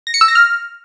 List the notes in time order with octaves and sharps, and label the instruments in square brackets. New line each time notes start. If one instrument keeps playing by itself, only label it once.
[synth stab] A#6
C#7
E6
A#6
F6